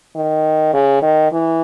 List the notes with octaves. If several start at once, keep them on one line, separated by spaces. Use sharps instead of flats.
D#3
C#3
D#3
E3